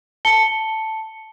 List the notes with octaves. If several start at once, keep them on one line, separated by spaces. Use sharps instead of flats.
A5 C#7 G7